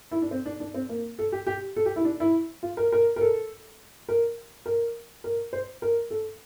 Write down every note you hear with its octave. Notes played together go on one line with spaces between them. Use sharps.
E4
D4
C4
D4
D4
C4
A#3
A4
G4
G4
A4
G4
E4
D4
E4
F4
A#4
A#4
A#4
A4
A#4
A#4
A#4
C5
A#4
A4